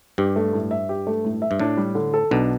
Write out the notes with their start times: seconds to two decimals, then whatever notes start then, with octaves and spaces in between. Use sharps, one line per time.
0.18 G2 G4
0.36 A3
0.53 A2
0.71 E5
0.89 G4
1.07 A3
1.25 A2
1.42 E5
1.51 G2
1.59 A2 D4
1.77 G3
1.95 D3
2.14 A4
2.31 B1 B2 D4